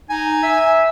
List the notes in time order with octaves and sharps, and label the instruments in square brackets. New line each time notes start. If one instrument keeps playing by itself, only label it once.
[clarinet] D#4 [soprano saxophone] G#5
[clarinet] E5